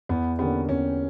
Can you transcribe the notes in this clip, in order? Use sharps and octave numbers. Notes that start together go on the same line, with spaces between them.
E2 B3
D3 A#3 B3 C#4 G4
E2 C#4